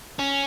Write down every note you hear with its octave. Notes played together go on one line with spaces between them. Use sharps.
C#4